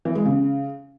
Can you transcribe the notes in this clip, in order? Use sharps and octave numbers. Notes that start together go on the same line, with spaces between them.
E3
G#3
C#3